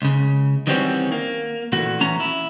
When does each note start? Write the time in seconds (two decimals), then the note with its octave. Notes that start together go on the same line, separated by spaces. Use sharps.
0.02 C#2 C#3
0.67 D#3 E3 G3 C4 C#4 F#4
1.12 A#3
1.72 A#2 E3 A3 F#4
2.01 E3 C#4 A#5
2.20 E4